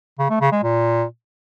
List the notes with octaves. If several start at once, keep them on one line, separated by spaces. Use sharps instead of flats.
C#3
A3
C#3
G#3
A#2